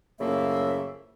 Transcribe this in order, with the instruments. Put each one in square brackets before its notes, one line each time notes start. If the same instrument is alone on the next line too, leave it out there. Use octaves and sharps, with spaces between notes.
[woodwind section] F#2 A2 C#3 F3 A#3 E5